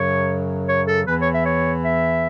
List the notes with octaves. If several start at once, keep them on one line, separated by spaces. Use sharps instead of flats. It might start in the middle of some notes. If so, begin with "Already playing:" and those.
Already playing: F#2 C#3 F#3 C#5
C#5
A4
E2 E3 B4
C#5
E5
C#5
E5